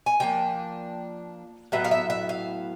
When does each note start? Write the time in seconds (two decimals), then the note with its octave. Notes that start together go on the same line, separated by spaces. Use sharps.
0.06 G#5
0.20 F3 A#3 D4 G5
1.72 A2 F#3 B3 E5
1.84 F5
1.91 E5
2.10 E5
2.29 F5